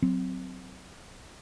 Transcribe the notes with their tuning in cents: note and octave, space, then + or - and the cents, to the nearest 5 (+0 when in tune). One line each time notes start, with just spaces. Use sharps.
F#3 +0 C4 -15